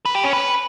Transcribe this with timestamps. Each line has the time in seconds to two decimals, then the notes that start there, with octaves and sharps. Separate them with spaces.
0.05 B4
0.15 G4
0.24 C#4
0.33 B4